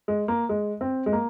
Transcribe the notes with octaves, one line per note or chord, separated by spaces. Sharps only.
G#3
A#3
G#3
C4
G#3
A#3